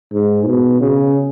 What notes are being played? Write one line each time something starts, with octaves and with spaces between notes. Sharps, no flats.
G#2
B2
C#3